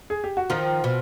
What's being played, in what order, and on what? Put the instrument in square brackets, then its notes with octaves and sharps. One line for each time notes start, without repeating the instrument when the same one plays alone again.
[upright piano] G#4
G4
F#4
[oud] D#3 F3 [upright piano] F4
[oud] B2